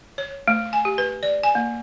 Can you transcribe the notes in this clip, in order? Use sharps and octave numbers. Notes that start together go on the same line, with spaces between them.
C#5
A3
G#5
G4
B4
D5
G#5
A#3